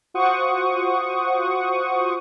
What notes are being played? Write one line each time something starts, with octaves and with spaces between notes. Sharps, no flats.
F4 F#4 C5 F#5 C#6 D#6